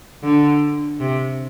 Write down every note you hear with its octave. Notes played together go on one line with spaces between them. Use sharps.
D3
C3